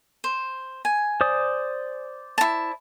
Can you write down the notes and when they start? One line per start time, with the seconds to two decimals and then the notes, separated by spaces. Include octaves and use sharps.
0.24 C5
0.85 G#5
1.21 C5 D5 D#6
2.38 E4 A5